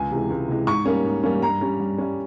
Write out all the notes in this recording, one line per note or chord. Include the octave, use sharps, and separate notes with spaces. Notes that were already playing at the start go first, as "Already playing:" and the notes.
Already playing: C#2 G#5
C3 E3 G#3
C#2
C3 E3 G#3
G#2 C#6
G3 A#3 C#4
G#2
G3 A#3 C#4
G2 A#5
G3 C#4
G2
G3 C#4